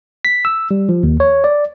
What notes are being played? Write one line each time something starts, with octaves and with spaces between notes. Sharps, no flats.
B6
E6
G3
F3
D#2
C#5
D5